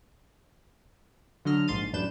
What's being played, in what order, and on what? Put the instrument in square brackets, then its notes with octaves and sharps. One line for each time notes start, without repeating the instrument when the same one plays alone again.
[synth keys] D3 F#3 D#5 F6
A#1 G#2 C6 A6 D#7
A1 F#2 D4 B4 G6 E7